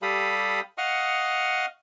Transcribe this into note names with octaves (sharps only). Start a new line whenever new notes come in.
G3 G4 A4 F5 B5 D#6
D#5 F5 F#5 C#6 D#6 F6